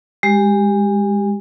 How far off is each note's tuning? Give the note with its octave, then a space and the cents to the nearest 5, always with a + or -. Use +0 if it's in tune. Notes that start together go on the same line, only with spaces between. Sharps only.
G#3 -25 G4 +0